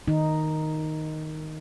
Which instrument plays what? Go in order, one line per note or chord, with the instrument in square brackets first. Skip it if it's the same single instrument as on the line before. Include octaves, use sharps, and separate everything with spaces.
[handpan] D#3 D#4